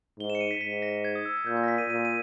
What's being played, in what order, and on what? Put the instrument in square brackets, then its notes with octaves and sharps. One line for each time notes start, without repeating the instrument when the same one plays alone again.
[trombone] G#2 [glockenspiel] G7
[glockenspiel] E7
C#7
D#7
B6
[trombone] G#2 [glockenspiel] B6
[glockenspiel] A#6
G#6
D#6
E6
G#6
[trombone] A#2 [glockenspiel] G6
[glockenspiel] G6
A#6
B6
D#7
[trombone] A#2 [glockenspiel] D#7
[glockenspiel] D#7